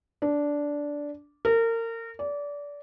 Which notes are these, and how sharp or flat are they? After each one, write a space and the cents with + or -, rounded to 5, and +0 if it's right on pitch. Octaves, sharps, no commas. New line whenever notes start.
D4 -10
A#4 -30
D5 -25